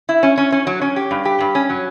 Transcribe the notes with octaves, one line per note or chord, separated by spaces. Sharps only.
E4
C#4
C#4
C#4
F#3
C#4
G4
G2
G4
G2
C#4
F#3